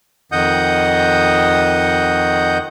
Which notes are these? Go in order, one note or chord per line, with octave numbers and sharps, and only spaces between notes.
F2 D#3 D#5 F#5 D#6 G6